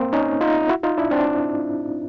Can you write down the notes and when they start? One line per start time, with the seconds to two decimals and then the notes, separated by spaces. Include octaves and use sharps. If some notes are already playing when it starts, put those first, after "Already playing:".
Already playing: A#3 C4
0.13 C#4 D#4
0.41 D#4 F4
0.69 E4 F#4
0.83 D#4 F4
0.98 D4 E4
1.11 C4 D4